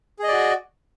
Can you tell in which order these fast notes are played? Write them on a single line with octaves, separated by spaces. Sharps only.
G#4 D#5 D5 F#4